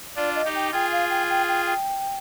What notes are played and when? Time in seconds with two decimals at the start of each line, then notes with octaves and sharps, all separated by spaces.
0.16 D4 F4 D5
0.35 D#5
0.44 D#4 G4
0.55 G5
0.72 F4 G#4 G5
0.92 F5
1.10 G5
1.29 G5
1.48 G5
1.66 G5